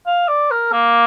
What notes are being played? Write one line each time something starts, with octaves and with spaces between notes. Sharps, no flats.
F5
D5
A#4
A#3